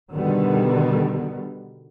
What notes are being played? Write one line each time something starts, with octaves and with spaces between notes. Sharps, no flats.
B2 D3 D#3 G3 B3